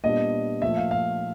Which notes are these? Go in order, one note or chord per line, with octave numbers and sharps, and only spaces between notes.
A#2 G3 B3 D4 D#5
A#2 F3 A3 E5
F5
F5